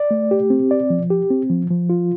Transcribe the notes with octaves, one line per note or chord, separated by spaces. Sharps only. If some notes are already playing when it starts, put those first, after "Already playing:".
Already playing: D5
A3
G4
C4
D5
F3
G4
C4
F3
F3
F4